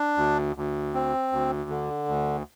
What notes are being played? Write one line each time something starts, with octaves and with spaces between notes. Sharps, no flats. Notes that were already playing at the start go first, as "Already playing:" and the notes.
Already playing: D4
D2
D2
C4
D2
D3
D2